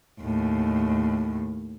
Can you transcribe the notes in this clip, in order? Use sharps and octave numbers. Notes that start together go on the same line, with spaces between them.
D#2 A2